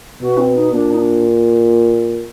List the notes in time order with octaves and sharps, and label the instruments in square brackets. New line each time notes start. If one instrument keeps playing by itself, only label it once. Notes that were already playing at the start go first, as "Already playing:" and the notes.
[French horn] B2 [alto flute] F#4
[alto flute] C4
D#4
[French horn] A#2 [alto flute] D4
[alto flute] D#4
D4